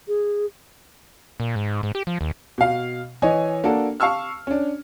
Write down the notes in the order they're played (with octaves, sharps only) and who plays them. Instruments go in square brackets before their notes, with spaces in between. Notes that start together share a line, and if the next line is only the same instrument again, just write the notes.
[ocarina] G#4
[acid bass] A#2
G#2
G#2
G4
F3
D#2
[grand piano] B2 F5
E3 C#5 D#5 G#5
A#3 D4 F#4 A4
F5 A5 C#6 E6 F6
C#4 D4